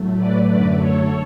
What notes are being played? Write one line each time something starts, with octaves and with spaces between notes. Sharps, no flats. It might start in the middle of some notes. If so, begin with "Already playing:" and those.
Already playing: A2 F#3 A3
B4 D5
F#2 D3 F#3 A3 B4 D5
A4 C#5